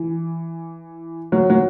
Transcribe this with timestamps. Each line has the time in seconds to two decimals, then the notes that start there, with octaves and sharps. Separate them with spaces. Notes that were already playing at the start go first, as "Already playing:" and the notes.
Already playing: E3
1.32 F#3
1.50 F#3